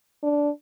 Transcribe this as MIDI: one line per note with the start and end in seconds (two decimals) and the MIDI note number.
0.23 0.50 62